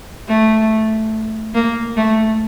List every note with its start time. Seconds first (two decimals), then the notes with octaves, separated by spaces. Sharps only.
0.28 A3
1.55 A#3
1.97 A3